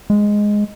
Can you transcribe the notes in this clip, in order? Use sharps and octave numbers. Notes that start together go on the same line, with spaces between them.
G#3